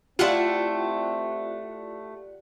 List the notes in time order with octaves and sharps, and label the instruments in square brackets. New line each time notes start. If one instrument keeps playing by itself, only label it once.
[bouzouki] A3 E4 [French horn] C4 [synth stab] F4 F#5 [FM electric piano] G4 D5